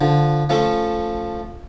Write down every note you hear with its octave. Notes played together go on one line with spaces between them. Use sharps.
D3 F3
F3 A3 C#4 A4